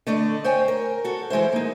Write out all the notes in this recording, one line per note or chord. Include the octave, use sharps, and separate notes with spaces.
D3 A3 D5 D#5
C5 C#5 G5 G#5
A#4
F#4 A4
E3 G#3 E4 C5
A#3 D#4